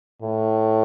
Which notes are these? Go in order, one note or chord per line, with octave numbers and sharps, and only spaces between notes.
A2